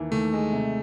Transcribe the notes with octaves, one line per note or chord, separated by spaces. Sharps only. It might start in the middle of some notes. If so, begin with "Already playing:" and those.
Already playing: D#2 E3 A#3
D#2 A3
G#3
C3